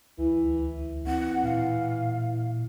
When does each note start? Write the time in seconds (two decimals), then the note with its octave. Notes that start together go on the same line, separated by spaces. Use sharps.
0.18 D2 E3
1.07 E3 C4 F#5
1.44 A#2 F5